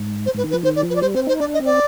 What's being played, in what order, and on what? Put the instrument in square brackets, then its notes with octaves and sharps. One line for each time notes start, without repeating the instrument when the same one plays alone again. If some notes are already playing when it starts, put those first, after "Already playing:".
Already playing: [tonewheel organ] G#2
[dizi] C5
[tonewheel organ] G#2 [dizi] B4
[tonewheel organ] D#3
[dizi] B4
[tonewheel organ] F3
[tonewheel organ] D#3 [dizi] C5
[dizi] D5
[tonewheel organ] F3
[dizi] B4
D5
[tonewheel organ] G3 [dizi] C5
[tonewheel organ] C4 [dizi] C5
[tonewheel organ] D#4 [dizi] C5
[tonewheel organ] D4 [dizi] D5
[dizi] D#5
[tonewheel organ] C4
[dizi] D5